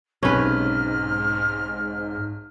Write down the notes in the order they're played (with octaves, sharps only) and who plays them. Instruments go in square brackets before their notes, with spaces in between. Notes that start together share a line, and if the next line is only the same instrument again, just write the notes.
[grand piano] B1 C3 [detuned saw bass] G#2 [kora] C#4 B4 [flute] F6